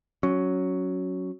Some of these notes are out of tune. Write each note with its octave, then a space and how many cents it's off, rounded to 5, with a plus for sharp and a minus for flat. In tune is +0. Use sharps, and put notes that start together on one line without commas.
F#3 +0 C#4 +0